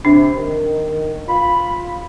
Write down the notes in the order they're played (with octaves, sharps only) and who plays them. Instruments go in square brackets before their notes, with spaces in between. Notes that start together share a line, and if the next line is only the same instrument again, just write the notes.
[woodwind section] C3 [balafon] D4
[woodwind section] D#3
F4 B5